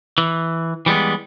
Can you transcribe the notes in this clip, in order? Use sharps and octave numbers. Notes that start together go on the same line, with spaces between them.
E3
E3 G3 G#3 B3